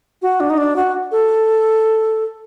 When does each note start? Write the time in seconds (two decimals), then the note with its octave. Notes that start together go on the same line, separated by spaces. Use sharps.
0.22 F#4
0.40 D4
0.50 D#4
0.58 D4
0.76 F#4
1.12 A4